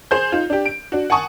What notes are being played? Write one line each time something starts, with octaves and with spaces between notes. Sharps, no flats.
G#4 C5 G6
D#4 F4
D4 G4
D7
D4 F#4
F#5 G#5 A5 C#6 D#6